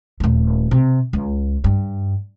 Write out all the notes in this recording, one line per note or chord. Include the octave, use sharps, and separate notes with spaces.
D#1 A3
C3
C#2
G2